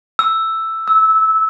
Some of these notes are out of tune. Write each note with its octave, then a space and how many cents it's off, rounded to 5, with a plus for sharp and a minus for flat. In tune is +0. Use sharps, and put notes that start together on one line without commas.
E6 +5
E6 -20